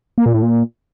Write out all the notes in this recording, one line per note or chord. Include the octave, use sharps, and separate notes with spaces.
A#3
A#2
A2
A#2